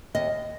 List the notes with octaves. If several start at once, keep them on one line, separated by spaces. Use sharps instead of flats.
D#2 D#5